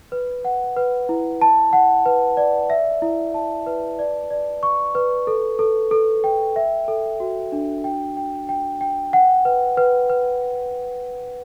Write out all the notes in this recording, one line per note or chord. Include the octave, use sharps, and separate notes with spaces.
B4
F#5
B4
E4
A5
F#5
B4
D5
E5
E4
A5
B4
D5
D5
C#6
B4
A4
A4
A4
G5
E5
A4
F#4
D4
G5
G5
G5
G5
F#5
B4
B4
B4